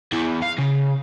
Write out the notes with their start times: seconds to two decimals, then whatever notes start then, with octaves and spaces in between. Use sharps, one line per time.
0.12 E2 E4
0.43 F5
0.59 C#3